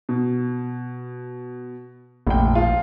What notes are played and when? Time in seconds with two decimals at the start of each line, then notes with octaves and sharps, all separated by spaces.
0.09 B2
2.27 F1 A#1 G5
2.55 F3 F4